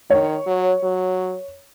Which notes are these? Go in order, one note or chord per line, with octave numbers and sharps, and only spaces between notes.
D#3 C#5
F#3
F#3